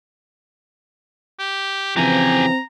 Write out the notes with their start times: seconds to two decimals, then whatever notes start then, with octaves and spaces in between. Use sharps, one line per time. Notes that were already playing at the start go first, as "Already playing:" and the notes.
1.39 G4
1.97 C#3 E3 F3 C4 G4 G#5 A#5